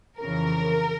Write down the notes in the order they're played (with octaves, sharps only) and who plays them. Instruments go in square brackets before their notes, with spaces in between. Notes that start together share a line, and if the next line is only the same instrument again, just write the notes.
[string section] F2 C#3 E3 A#4